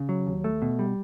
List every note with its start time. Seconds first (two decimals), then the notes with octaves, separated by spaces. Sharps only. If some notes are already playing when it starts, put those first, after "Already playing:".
Already playing: C#3
0.09 F#3
0.27 D#2
0.44 A3
0.62 B2
0.79 G3